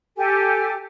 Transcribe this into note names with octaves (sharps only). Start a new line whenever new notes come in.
G4 A4 G#5